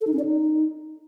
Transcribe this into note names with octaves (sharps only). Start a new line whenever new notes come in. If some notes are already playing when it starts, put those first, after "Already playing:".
A4
D#4
C#4
D5
D#4